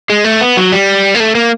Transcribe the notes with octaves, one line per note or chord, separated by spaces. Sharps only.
G#3
A3
B3
F#3
G3
A#3
A3
A#3